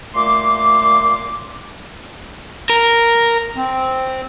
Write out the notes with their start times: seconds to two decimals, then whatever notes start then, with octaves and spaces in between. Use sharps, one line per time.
0.14 A#2 A3 C6 D6
2.70 A#4
3.56 C4